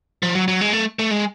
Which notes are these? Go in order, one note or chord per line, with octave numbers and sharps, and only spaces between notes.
F3
F#3
F#3
G#3
A3
A3
G#3